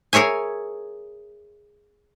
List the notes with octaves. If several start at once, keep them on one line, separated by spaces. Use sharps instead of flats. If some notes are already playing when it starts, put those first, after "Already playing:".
G#4 A#4 C#5 E5 G#5